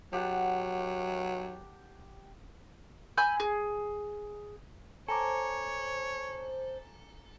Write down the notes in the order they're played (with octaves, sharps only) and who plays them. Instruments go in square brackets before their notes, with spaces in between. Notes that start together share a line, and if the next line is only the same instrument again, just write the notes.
[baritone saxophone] F#3 [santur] G4 F#5 A5
[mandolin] G#5 B5 E6 G6
G#4
[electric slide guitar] A4 [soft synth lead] C5 [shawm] C#5 [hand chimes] G#5 A#5 D6